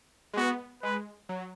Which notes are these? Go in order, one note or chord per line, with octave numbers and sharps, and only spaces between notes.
G#3
B3 F#4
G#3 B4
F#3